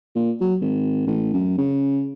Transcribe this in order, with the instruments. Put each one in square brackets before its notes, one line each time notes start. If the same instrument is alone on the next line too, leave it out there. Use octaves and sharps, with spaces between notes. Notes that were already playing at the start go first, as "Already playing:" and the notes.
[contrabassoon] A#2
F#3
G#1
A1
F#2
C#3